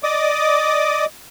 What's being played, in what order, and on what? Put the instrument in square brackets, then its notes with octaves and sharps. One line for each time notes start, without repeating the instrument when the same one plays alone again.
[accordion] D5 D#5 D6 D#6